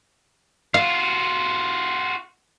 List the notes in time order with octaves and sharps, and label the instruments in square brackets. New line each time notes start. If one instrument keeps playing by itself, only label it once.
[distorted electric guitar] F4 F#4 [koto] F5